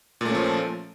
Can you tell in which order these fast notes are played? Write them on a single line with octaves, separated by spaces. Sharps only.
A#2 A3 C#4 F3